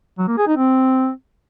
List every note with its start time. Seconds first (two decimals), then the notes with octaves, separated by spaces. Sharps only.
0.18 F#3
0.28 A#3
0.38 G#4
0.47 D#4
0.57 C4